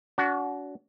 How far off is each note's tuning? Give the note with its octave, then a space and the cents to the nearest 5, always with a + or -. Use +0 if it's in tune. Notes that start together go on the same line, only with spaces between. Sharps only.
D4 -45 F#4 +0